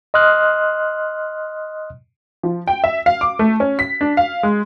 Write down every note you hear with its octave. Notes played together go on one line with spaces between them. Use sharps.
D#5 C6 D#6 F6 F#6
F3
G5
E5
F5
D6
A3
C#4
B6
D4
F5
G#3